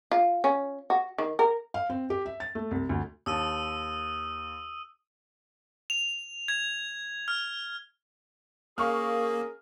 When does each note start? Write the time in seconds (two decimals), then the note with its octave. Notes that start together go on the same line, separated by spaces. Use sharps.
0.12 F4
0.44 C#4
0.90 F#4
1.18 D#3
1.39 A#4
1.74 F5
1.90 C4
2.10 G4
2.26 E5
2.40 A6
2.55 A3
2.71 C2
2.89 D2
3.26 D#2 A5 D#6 E6 D#7
5.90 F7
6.48 G#6
7.28 F6
8.78 A#3 C#4 G#4 A#4 F5 C#6 F6